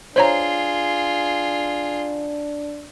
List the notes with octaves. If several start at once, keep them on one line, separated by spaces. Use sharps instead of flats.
D4 F4 G#4 C5 C#5 A#5